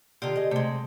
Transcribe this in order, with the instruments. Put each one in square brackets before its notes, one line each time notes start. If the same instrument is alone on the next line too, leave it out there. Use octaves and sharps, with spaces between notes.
[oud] D3 D#3 F4 [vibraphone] G4 D5
[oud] G#4 D#5
[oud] C3 G#3 [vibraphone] A3